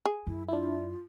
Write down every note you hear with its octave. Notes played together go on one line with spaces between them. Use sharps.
G#4
F#2 E4
D4 E4 F4